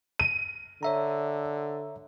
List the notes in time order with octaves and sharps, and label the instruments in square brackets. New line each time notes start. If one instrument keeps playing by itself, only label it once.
[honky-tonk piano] D#7
[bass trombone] D3 [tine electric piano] C#5 E5 A#5